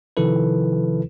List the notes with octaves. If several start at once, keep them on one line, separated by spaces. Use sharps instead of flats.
C3 D#3 F3 E4 A4 B4